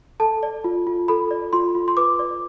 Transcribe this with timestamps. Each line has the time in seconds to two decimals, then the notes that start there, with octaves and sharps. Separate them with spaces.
0.20 A4 A5
0.43 D5
0.64 F4
0.87 F4
1.08 A4 B5
1.31 D5
1.53 F4 C6
1.75 F4
1.88 C6
1.97 B4 D6
2.19 D5